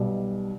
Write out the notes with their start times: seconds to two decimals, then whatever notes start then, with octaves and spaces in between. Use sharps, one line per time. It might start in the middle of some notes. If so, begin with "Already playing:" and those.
Already playing: B1 B2 G3